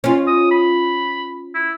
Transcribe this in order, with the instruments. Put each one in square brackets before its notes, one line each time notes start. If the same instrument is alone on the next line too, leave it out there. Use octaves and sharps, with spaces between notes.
[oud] C#4 F4
[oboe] D#6
B5
E4